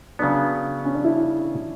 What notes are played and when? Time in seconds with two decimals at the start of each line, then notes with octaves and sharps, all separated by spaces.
0.19 C#3 F#3 B3 D4
0.85 C#4
0.95 D4
1.04 E4